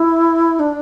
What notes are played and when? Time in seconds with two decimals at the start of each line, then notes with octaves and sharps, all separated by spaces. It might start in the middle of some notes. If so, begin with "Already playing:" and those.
Already playing: E4
0.59 D4